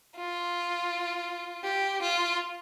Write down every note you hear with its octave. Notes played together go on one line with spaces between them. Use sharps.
F4
G4
F4